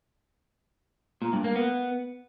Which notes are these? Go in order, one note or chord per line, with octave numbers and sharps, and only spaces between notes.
A#2
G2
A#3
B3